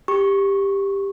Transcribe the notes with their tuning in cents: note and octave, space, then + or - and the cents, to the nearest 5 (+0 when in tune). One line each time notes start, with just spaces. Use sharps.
G4 +10 C#6 -15